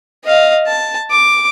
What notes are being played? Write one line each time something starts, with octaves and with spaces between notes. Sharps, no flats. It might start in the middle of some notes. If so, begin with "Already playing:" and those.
D#5 F5
A5
D6